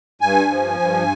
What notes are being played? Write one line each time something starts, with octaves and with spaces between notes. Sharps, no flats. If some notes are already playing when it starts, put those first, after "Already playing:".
G2 G#5
F3
G2